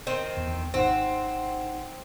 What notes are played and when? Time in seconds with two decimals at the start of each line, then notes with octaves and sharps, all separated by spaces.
0.07 D#3 C4
0.37 E2
0.74 G#1 C4 D#4 F#5